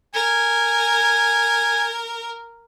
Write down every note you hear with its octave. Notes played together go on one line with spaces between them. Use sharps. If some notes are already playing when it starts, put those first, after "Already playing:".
A#4 G#5